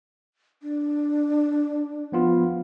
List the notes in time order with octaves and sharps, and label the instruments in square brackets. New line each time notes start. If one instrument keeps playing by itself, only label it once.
[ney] D4
[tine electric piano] F3 B3 F4